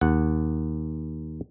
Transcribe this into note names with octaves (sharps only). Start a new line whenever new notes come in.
D#2 F#5